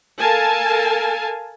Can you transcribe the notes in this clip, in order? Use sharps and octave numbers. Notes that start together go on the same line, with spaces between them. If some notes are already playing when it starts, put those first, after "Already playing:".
A4 A#4 F5 G#5 A5